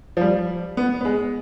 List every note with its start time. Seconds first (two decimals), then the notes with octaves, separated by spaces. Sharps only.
0.17 F3
0.21 G3
0.77 B3
1.01 B3
1.05 G#3